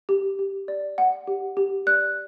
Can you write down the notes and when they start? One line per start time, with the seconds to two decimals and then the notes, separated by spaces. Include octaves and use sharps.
0.09 G4
0.39 G4
0.68 D5
0.98 F#5
1.27 G4
1.57 G4
1.87 D5 F#6